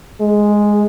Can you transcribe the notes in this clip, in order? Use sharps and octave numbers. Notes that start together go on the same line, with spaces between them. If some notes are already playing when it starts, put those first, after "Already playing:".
G#3